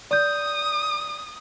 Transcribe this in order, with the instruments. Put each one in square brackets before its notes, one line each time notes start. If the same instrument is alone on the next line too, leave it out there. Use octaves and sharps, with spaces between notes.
[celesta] D5 G6 [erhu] D#6